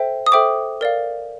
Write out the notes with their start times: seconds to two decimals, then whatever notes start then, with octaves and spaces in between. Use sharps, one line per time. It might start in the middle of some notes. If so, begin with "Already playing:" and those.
Already playing: A4 C5 E5 G5
0.27 D#6
0.32 A4 C5 E5 G5 D6
0.81 A#4 D5 F5